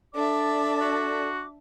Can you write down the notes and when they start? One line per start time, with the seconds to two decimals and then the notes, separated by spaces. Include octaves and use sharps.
0.14 D4 A4 D5 E5 D6
0.81 F#4